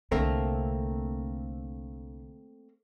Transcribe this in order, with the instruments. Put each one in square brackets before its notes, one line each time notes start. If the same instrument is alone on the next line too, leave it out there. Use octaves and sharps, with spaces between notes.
[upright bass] C2 D3 [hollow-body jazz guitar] A3 A#3 C4